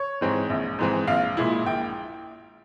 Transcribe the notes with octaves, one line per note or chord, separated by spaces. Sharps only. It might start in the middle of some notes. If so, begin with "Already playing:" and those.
Already playing: C#5
G#2 E3 G#3 C4
A#1
G#2 E3 G#3 C4
A#1 F5
A#2 G#3 E4
A#1 G5